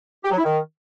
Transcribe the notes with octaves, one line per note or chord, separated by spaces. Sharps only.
G4
F#3
E4
D#3